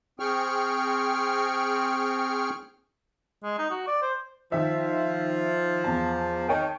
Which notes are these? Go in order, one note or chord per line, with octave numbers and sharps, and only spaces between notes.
C4 G#4 G5 C#6 F6
G#3
D#4
F#4
D5
C5
D#3 F3 E5
E2 A5
D#3 C#5 G5 A5